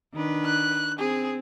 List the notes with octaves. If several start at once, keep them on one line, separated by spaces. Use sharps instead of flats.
D#3 D4 B4
F#6
C4 G#4